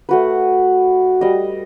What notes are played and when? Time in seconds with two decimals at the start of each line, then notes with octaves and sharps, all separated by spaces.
0.09 A3 F#4 B4
1.21 G3 D#5